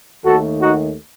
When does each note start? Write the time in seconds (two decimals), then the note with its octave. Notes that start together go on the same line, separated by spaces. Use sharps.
0.24 D#2 D#3 A3 F#4 A4
0.60 D#4 F#4